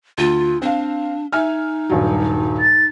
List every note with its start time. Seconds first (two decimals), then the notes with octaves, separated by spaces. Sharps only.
0.18 D2 F4
0.62 C4 D4 F5
1.33 D#4 E5 G#5 F6
1.90 D#1 G2 F#3
2.60 A6